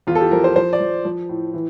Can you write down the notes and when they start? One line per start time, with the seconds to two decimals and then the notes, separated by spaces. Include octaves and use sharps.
0.07 E2 F4
0.15 A4
0.20 G4
0.31 F3 A#4
0.44 C5
0.56 F3 C5
0.73 D5
0.81 F3
1.05 F3
1.29 A2
1.54 E3